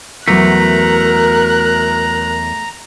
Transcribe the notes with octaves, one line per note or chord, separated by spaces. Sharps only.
E2 F#3 A3 A#4 A#5 F#6